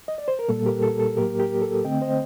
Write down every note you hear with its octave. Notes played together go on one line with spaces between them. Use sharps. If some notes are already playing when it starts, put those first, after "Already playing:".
D#5
D5
C5
A#4
A#2 G3 A#3 A4
G4 A#4
A4
A4
A2 F#3 A#3 G4 A#4
G4 A#4
A4
D3 A3 C4 D#5 G5
C5 D#5